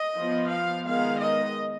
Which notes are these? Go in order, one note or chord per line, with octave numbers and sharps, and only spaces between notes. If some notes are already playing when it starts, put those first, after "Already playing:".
Already playing: D#5
F3 B3
F5
D#3 G#3 B3 F5
D#5